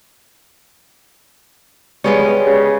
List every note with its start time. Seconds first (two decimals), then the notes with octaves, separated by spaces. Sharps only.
2.04 G3 G#3 B3 C#4
2.47 C#3